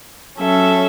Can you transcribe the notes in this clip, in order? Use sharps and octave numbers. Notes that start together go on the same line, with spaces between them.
F#3 C#4 A4 E5